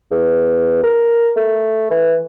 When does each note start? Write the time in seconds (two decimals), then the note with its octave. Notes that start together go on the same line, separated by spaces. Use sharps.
0.11 E2
0.83 A#4
1.36 A3
1.91 E3